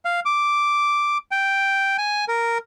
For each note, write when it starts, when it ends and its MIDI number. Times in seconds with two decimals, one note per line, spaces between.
0.05 0.20 77
0.25 1.18 86
1.31 1.97 79
1.98 2.25 80
2.28 2.58 70